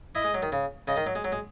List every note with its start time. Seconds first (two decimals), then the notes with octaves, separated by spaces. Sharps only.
0.15 E4 D#5
0.24 G#3
0.34 F#3
0.42 D#3
0.52 C#3
0.88 C#3 D#5
0.97 D#3
1.06 F#3
1.15 G#3
1.24 F#3
1.32 G#3